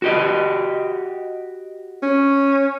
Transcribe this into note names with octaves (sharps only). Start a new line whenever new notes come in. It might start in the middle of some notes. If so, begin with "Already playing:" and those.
F#4 G4 D#5
C#4